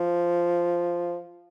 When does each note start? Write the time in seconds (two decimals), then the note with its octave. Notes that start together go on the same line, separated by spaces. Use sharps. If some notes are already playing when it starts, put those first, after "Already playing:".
Already playing: F3